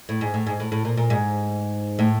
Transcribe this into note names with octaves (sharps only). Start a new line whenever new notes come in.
A2
G#2
A2
G#2
A2
A2
A#2
A#2
G#2
A2